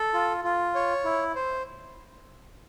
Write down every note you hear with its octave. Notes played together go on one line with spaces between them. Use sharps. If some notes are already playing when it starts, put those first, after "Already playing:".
Already playing: A4
F4
F4
C#5
E4
C5